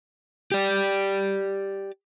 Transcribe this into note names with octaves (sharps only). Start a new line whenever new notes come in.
G4 D5